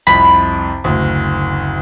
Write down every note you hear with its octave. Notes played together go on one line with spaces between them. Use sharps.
C2 F2 B5
F#1 D2